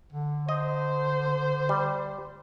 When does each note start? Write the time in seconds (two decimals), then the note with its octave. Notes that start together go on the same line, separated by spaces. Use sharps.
0.12 D3
0.49 C5 D#5
1.69 G3